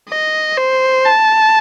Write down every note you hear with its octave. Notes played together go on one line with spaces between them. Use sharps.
D#5
C5
A5